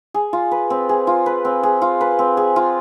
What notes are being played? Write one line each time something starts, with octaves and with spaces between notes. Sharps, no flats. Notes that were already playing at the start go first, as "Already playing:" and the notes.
G#4
F4
B4
C4
G#4
F4
B4
C4
G#4
F4
B4
C4
G#4
F4